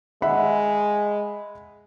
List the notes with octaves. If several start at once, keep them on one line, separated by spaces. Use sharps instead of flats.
G#3 E5 F#5 B5